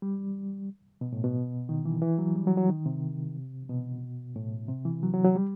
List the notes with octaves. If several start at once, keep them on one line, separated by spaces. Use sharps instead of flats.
G3
B2
A2
B2
D#3
E3
E3
F#3
G3
F#3
F#3
D#3
C3
B2
A2
C3
E3
F#3
F#3
F#3
G3